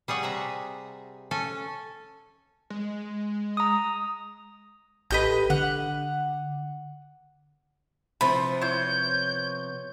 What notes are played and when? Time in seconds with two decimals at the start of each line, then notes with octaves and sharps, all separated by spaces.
0.08 G3 G#4 C#5 F#5
0.23 C3 E5 A#5
1.31 C#4 A4 G#5
2.70 G#3
3.57 A#5 D#6
5.11 A1 G4 A4 B4 D#5 G6
5.50 D3 F#5
8.21 C3 E3 F3 B3 C5 B5
8.62 E4 C5 C#5 G6